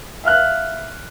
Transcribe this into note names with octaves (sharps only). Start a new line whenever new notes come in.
E5 F5 F6 F#6